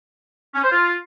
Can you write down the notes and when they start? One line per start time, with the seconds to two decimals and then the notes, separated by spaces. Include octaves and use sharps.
0.55 C#4
0.63 C5
0.71 F4